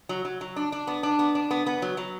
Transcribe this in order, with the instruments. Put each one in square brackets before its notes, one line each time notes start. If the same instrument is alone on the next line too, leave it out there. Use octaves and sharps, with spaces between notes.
[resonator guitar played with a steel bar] F#3
F#3
F#3
D4
D4
B3
D4
B3
D4
B3
B3
F#3
F#3